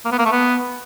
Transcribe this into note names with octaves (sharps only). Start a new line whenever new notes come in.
A#3
B3
A#3
A3
B3